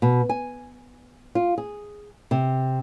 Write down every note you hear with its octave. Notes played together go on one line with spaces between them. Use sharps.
B2
G#5
F4
G#4
C3